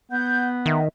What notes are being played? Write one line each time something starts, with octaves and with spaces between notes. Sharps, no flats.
B3 F#5 G6
D#3 D#5 E5